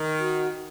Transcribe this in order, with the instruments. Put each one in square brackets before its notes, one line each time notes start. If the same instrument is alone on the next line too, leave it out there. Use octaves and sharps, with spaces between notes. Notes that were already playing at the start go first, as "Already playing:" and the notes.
Already playing: [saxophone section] D#3
[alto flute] F#4